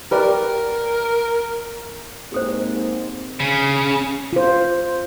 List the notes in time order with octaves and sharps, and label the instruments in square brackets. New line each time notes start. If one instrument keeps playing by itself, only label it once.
[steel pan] G4 B4 D5 [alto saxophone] A#4
[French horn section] G#2 A#3 C4 [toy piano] G4 A4 C5
[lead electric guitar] C#3
[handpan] F4 C5